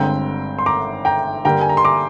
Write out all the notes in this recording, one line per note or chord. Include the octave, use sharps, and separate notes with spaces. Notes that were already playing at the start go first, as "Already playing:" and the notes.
Already playing: G1 G2 D3 G#3 C4 G5 A#5
C6
A#5 D6
G5 A#5
G2 D3 G3 A#3 G5 A#5
G#5
A#5
C6
A#5 D6